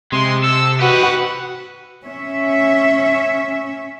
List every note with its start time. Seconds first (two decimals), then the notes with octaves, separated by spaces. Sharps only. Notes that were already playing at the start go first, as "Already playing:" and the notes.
0.12 C3 G#3 C6
0.44 A4 E6
0.81 F#4 G4 B4 D#5 F#5
2.05 C#4 E5